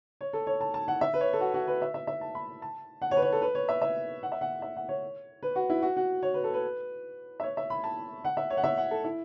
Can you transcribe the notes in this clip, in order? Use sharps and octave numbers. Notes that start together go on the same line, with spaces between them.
C#5
A4
C#5
A5
A5
F#5
E5
B4
C#5
A4
F#4
F#4
B4
E5
E5
E5
A5
B5
A5
F#5
C#5
B4
C#5
A4
B4
C#5
E5
E5
F#5
E5
F#5
E5
F#5
C#5
B4
F#4
E4
F#4
F#4
C#5
B4
A4
B4
E5
C#5
E5
B5
A5
F#5
E5
C#5
F#5
E5
F#5
A4
E4